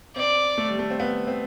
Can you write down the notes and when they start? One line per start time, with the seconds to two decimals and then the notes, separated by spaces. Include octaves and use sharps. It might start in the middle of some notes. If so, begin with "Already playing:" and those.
0.16 C4 D5
0.58 A3
0.69 G3
0.79 A3
0.90 C4
1.00 B3
1.27 C4